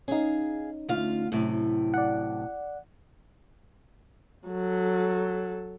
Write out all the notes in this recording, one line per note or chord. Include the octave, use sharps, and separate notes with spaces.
C#4 D#4 G#4 F5
D2 F4 F5
F#2 A2 C3
D5 F#5
F#3 A4